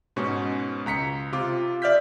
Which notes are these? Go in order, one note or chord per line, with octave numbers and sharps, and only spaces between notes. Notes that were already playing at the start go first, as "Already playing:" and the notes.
G#2 B2 C#4 C#6
C#2 A#5 B6 C#7
C3 F4 D6
D5 E5 F6 G6 B6